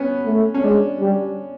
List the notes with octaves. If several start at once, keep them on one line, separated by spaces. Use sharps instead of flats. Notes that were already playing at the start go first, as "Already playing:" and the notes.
Already playing: B3 C#4
A3
C#4
G#3 D4
G3